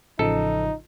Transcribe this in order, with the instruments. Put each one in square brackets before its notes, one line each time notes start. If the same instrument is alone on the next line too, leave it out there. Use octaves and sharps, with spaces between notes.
[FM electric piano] A1 C#3 F3 [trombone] D#4 [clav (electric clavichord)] A4